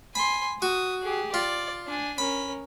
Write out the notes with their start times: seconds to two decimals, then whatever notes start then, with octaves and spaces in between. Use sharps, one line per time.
0.15 G#5 B5 C6
0.62 F#4 D#6
1.03 G4 G#4
1.34 F4 D5
1.87 D4 G#5
2.18 C#4 A#4 B5